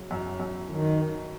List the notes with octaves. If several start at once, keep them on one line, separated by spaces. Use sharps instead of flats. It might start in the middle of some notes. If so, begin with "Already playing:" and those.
Already playing: F#2 C#3 F#3
F#2
F#2
D#3 F#3